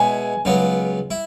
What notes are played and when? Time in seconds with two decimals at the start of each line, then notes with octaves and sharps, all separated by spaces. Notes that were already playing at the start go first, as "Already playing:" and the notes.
Already playing: B2 G#3 B3 E4 C#5 G#5
0.45 C#2 C#3 F#3 B3
1.11 E4